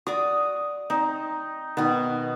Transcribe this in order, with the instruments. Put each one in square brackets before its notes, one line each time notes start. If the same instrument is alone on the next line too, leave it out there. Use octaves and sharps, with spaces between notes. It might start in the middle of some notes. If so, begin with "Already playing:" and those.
[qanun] F#4 D5 [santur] D#6
[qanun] C4 [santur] D#4
[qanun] B2 D#3 [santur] B3